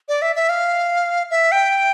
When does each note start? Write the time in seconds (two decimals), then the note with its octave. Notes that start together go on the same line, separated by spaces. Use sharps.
0.09 D5
0.22 E5
0.36 E5
0.49 F5
1.31 E5
1.52 G5